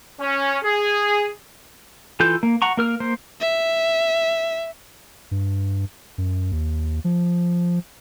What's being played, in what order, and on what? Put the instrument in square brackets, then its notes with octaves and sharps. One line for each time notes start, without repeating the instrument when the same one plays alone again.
[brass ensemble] C#4
G#4
[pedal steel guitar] E3 F4 A4 G6
A#3
F#5 A#5 C#6
A#3 A#4 F6
A#3 C5
[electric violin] E5
[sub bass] G2
F#2
D#2
F3